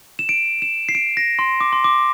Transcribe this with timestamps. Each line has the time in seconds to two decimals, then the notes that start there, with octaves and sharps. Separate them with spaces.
0.19 E7
0.29 D7
0.62 E7
0.89 C7
0.95 D7
1.17 A#6
1.39 C6
1.61 D6
1.73 C6
1.84 D6